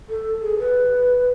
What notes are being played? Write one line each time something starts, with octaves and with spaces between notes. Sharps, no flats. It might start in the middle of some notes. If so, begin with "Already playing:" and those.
A4
G#4
B4